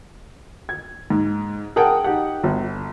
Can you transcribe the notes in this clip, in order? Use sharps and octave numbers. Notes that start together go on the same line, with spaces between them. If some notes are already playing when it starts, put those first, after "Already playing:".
G#6
G#2
G#4 A#4 F#5 G5 A5
D#4 G4 F#5
G1